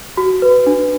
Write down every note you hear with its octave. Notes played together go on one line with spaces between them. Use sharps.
F#4
B4
D4